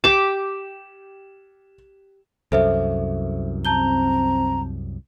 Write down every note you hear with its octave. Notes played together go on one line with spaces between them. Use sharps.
G4 D6 E7
C2 F#2 A4 C5 E5
C4 A5 A#5 G6 G7